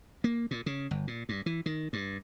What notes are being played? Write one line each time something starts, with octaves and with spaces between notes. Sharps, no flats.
A#3
A#2
C#3
G1
A#2
G2
E3
D#3
G2